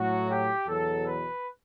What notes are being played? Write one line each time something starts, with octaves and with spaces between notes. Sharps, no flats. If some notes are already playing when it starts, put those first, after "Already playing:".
Already playing: A2 F#3 F#4
G4
E2 B2 F#3 A4
B4